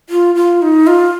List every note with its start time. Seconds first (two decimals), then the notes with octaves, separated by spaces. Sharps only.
0.10 F4
0.35 F4
0.62 D#4
0.87 F4